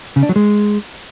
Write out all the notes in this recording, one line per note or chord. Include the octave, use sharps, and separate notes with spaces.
C#3
D4
F#3
G#3